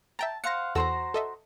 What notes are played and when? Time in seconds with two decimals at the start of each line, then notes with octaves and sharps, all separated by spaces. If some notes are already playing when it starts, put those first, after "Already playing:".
0.19 E5 G5 A5 A#5
0.44 C5 F5 F#5 A#6 C#7
0.75 E2 F#4 A4 C5 A#5 E6
1.14 A4 D#5 E5